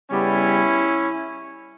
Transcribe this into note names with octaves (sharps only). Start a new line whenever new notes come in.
C#3 G3 B3 C#4 E4